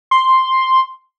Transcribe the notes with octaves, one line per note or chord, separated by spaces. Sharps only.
C6